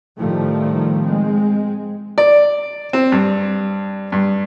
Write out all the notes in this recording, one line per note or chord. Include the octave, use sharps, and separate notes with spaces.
A2 D#3 F3 G3 A3
G#3 C4
D5
C4
G2
G2